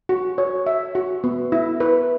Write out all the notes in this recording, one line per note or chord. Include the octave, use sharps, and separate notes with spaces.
F#4
C#5
E5
F#4
B3
E4
B4